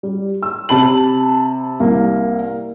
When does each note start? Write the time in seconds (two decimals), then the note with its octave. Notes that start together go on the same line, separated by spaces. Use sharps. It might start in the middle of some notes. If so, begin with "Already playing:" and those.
0.03 G3
0.43 E6
0.69 C3 A5 B5 F#7
1.80 C2 A#3